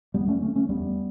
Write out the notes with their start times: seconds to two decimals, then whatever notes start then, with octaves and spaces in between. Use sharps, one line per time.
0.14 E2 G3 B3
0.28 A3 C#4
0.42 D3 A3 C#4
0.55 A3 C#4
0.69 E2 G3 B3